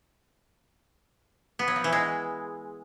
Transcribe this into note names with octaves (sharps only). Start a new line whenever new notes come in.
B3
F#3
F3
E3
G#3